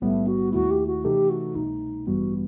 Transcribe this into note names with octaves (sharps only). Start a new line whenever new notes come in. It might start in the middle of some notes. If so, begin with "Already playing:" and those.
B1 A2 G3 A3 B3
F#4
D#2 D#3 A3 E4 F#4
G4
F#4
C3 E3 A3 D#4 G4 A4
F#4
C2 B2 A3 D#4
A1 G2 E3 G3 B3 F#4